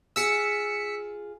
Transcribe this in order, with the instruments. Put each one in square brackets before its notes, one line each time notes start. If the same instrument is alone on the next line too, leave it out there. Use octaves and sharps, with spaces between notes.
[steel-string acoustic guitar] F4 G#4 [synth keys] E6 B6 C#7